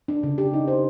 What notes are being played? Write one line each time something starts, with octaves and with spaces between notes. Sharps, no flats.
D4
C#3
G4
D#4
C5